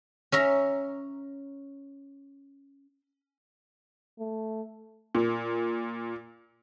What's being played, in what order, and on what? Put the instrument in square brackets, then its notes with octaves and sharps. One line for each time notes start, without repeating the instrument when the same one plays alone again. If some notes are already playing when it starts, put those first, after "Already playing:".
[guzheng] C#4 E5 A#5
[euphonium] A3
[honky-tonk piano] A#2